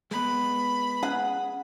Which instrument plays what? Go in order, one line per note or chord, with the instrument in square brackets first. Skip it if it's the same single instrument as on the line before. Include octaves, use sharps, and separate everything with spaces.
[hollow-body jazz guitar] G#3 B3 [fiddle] B5
[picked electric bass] C#4 [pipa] G#4 F#5